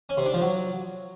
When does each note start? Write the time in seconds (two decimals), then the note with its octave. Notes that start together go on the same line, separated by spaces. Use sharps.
0.09 C#4
0.17 C3
0.26 D4
0.34 F3
0.42 F#3